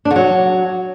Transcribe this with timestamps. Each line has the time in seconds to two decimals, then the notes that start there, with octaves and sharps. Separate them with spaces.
0.05 D4
0.11 D3
0.16 F#3